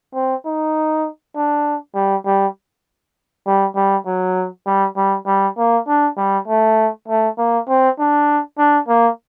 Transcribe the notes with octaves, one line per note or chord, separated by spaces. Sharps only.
C4
D#4
D4
G3
G3
G3
G3
F#3
G3
G3
G3
A#3
D4
G3
A3
A3
A#3
C4
D4
D4
A#3